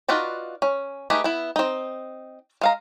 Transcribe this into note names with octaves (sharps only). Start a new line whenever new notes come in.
D#4 F4 F#4 B4 D5
C#4
A3 D#4 G4 G#4 B4
B3 E4
C4 D#4
G#3 F5 A#5